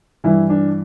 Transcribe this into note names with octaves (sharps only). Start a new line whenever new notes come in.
G2 E3 E4
D4